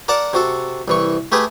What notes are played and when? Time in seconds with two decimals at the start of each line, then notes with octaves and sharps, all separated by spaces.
0.08 A#4 D5 F#5 A5
0.33 C3 F#4 A4
0.88 C2 E3 C#6
1.32 A3 G4 G#4 B4